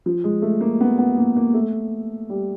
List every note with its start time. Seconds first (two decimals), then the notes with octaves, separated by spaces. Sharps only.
0.06 F3
0.24 G#3
0.42 A3
0.61 A#3
0.81 B3
0.98 B3
1.18 A#3
1.36 A#3
1.54 A3
2.29 G3